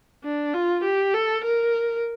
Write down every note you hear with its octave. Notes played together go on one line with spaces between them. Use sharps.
D4
F4
G4
A4
A#4